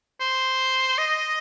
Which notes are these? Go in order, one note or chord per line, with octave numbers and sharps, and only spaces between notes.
C5
D#5